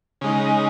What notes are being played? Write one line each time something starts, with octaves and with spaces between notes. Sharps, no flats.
C#3 G#3 D#4